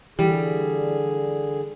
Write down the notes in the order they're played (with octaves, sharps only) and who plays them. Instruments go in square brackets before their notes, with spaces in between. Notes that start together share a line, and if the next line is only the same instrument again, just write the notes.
[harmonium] D3 G#4 [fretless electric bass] E3 [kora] G3